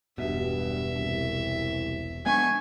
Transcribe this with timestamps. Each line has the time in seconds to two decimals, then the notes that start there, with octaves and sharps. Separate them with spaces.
0.18 E1 G2 B2 E5
0.97 C2
2.26 G#3 B3 D4 G#5 C#6